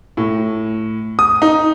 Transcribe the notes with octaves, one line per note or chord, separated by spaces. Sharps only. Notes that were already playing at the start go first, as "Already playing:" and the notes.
A2
D#6
D#4